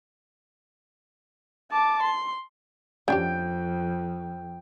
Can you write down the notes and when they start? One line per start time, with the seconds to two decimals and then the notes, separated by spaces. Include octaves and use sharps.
1.71 A5 D6
2.03 C6
3.08 F2 C#4 D4 G4 G5